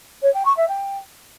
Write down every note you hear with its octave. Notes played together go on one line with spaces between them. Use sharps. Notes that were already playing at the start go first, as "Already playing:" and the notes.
C#5
G5
C#6
E5
G5